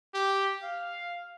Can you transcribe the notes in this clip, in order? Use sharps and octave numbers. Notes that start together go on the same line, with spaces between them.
G4
F5